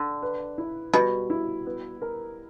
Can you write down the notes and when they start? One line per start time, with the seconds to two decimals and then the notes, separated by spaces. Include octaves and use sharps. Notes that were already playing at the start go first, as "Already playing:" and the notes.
Already playing: D3 D4
0.22 B4
0.58 E4
0.93 B2 G3
1.30 E4
1.66 B3
2.02 A#4